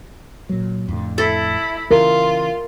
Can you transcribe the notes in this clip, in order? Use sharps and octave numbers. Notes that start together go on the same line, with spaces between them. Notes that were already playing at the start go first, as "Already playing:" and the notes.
A#2 F#3
F2 A2 D3
E4 A4
C#3 E3 F4 A#4